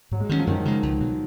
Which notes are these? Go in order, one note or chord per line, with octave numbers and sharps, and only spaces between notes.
G#2 F#3
G#3
D#3 F#3 A#3 C#4
F3
F#2 D#3
C#3 G#3
C#2
B2 F#3